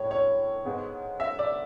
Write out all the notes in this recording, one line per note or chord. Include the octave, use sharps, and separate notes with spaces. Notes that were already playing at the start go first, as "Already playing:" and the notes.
Already playing: A2 G#3 C#5
C#5
G#2 G#3 B3
E5
D5